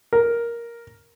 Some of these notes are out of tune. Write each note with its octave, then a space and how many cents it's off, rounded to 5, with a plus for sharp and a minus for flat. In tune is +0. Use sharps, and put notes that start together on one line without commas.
A#4 +5